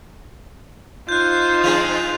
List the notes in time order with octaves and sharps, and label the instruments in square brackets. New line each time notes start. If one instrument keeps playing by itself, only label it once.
[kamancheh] D#4 C5 [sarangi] F4 [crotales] F#6 G6
[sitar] F3 G#3 C4 [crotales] B6 D#7 F7